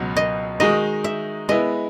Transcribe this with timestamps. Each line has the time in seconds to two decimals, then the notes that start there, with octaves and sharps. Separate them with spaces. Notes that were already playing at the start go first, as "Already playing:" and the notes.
Already playing: C#2 B2 F#3
0.16 D#5
0.60 D#3 G#3 D#4 F#4 D#5
1.04 E5
1.49 G#3 B3 E4 D#5